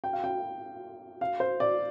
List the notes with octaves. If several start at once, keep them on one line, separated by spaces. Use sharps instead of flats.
G5
F5
G5
F5
C5
D5